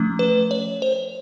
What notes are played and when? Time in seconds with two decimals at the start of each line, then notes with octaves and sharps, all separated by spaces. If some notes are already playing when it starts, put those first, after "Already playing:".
Already playing: F3 A3 C#4
0.19 B4
0.51 C#5
0.82 C5